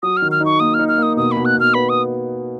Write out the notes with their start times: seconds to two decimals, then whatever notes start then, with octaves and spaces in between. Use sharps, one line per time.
0.03 F#3 D#6
0.17 F6
0.22 D#3
0.32 F6
0.41 D#4 C#6
0.60 A#3 D#6
0.74 D#4 F6
0.88 F6
0.98 A#3 D#6
1.17 B2 D#6
1.32 B5
1.37 B2
1.45 F#6
1.55 B2
1.60 F6
1.74 B3 B5
1.89 D#6